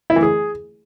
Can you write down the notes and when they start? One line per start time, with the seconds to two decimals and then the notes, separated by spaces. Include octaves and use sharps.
0.10 E4
0.16 E3
0.23 G#4